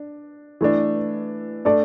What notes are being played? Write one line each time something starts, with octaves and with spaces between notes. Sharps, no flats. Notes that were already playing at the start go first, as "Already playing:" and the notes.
Already playing: D4
E3 A3 D4
A3 D4 A4 D5